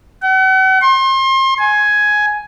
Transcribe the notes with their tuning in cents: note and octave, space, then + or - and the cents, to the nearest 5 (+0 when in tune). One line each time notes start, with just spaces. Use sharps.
F#5 +40
C6 +35
G#5 +10